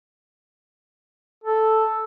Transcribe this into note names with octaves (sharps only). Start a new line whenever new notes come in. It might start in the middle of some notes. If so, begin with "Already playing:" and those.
A4